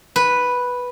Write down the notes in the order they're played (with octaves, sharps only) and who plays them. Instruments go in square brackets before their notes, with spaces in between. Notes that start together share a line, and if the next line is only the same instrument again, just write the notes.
[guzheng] B4